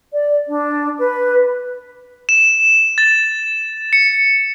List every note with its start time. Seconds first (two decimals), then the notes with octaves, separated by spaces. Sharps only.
0.12 D5
0.47 D4
0.98 B4
2.29 E7
2.98 A6
3.93 C#7